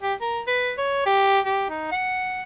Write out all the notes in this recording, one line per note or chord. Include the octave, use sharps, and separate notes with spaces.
G4
A#4
B4
C#5
G4
G4
D#4
F#5